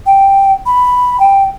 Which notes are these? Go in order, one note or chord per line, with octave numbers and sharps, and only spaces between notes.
G5
B5
G5